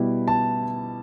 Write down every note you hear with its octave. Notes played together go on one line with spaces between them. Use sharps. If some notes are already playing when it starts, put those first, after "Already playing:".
Already playing: B2 G3 E4
A5